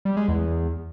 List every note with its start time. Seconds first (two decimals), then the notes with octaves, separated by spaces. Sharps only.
0.05 G3
0.17 G#3
0.28 E2